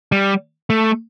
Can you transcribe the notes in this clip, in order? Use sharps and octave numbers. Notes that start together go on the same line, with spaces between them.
G3
A3